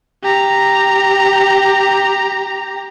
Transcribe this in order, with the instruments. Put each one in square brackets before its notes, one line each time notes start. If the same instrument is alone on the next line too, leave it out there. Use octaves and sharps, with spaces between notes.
[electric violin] G4 A#5